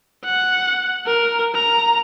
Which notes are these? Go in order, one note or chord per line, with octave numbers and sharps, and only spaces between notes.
F#5
A#4
A#5